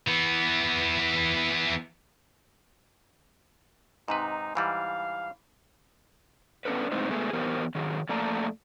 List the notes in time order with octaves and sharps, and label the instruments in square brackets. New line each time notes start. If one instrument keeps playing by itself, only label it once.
[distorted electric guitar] E3 B3
[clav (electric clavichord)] G#2 C3 B4 [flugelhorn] D#4
[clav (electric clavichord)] G#2 E3 G3 [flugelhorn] F5
[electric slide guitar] B3 C#4 D4 A4 B4
A2 G#3 C4 D#4 B4 C5
G#3 A3 B3 G#4
E3 B3 G4 A#4 C5
D#3 F#3 G#4
F2 A3 A#3 D5 A5 A#5